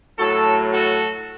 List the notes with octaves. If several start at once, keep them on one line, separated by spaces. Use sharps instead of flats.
A2 F#3 F#4 A4
F#4 A4